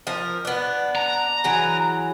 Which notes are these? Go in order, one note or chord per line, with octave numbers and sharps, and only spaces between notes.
F3 A#4
B3 D4
A#5
E3 F#3 G#4